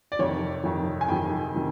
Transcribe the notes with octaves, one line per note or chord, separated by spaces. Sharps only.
D5
F2 C3 D#3 C#5
F2 C3 D#3
G#5
F2 C3 D#3 G5
C3 D#3